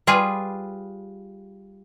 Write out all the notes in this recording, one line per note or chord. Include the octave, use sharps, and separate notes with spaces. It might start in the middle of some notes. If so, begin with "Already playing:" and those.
G3 F4 G#4 B4